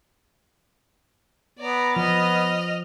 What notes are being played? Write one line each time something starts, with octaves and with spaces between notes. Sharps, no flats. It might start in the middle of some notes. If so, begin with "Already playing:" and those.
B3 D5 A#5
F3 B3 D#5 F6